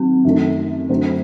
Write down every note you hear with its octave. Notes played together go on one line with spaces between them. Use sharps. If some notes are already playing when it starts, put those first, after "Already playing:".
Already playing: D#3 F#3 A#3 C4 F#4
F#2 D#3 A3
F#2 D3 F#3 A3 C4